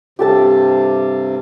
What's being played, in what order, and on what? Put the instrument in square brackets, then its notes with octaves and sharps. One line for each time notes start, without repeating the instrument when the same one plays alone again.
[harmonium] G2 C3 [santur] G4 A4 A5